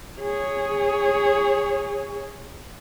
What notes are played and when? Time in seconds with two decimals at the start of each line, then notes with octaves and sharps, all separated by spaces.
0.20 G#4 C#5